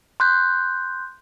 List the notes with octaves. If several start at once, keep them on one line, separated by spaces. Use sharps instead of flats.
C6 F#6 G6